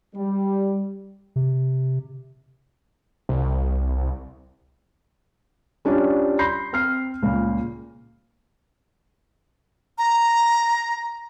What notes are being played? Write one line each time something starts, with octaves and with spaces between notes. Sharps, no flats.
G3
C3
C2
G3 C#4 D4 F4 D5
B5 C6 G6 A#6 C7
C4 F6 C7
C#2 A#2
A#5